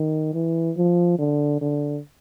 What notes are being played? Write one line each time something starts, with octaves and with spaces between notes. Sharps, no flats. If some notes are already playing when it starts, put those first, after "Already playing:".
Already playing: D#3
E3
F3
D3
D3